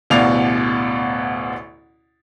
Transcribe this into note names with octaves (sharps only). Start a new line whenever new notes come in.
A1 D2 B2 D5 F5 F7